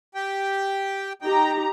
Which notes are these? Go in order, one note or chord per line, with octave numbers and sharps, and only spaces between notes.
G4 G5
D#4 G4 G5 A#5